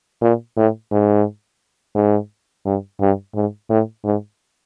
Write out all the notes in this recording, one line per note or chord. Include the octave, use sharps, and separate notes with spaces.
A#2
A2
G#2
G#2
G2
G2
G#2
A2
G#2